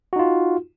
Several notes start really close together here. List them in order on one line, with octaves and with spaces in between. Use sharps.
F#4 D#4 F4